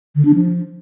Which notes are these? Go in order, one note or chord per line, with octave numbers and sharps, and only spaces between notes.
D3
D4
F3